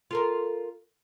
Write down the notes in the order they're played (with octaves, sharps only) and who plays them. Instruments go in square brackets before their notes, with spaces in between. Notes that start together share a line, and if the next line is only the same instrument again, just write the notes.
[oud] F4 A4 A#4